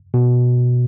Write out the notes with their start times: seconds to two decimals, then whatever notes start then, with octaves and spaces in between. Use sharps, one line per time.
0.14 B2